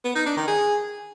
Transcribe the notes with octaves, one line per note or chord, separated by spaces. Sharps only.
B3
D#4
D4
D#3
G#4